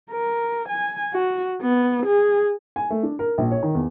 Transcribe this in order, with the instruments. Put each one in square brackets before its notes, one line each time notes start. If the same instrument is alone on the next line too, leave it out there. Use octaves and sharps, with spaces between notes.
[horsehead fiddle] A#4
G#5
F#4
B3
G#4
[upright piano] G#5
A3
D4
A#4
A#1
C#5
D#3
E2